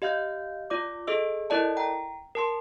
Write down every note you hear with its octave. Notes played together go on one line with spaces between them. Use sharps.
G4 D#5 F5 F6 G6
F4 D5 D6
G#4 A4 D#5 E6
E4 A4 A#4 D5 D#5 A5
G5 A#5
A#4 A5 C6